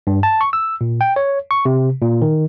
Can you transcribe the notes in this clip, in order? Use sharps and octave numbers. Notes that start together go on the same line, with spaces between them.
G2
A5
C#6
E6
A#2
G5
C#5
C#6
C3
A#2
D#3